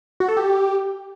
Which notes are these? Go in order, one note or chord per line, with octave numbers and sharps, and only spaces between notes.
F#4
A4
G4